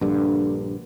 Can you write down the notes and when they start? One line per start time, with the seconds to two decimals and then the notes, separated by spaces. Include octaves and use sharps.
0.01 A#1 G2 D3